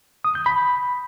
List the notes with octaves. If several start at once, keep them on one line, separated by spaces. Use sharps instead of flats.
D#6
G6
B5